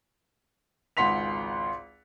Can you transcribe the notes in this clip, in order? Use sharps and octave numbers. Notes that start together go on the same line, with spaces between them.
G#1 C#2 F#5 C6 B6 F7